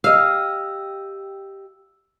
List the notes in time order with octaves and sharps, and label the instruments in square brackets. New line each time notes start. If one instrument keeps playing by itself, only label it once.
[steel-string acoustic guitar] G4 D#5 [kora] F5 [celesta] E6